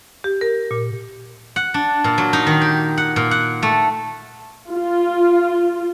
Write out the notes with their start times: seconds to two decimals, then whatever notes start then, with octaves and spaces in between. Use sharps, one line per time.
0.24 G4
0.41 A#4
0.71 A#2
1.56 F#5
1.74 D4
2.04 A#2
2.18 F#3
2.33 D#4
2.47 D#3
2.61 G4
2.97 F#5
3.16 A#2
3.31 F#5
3.63 A3
4.70 F4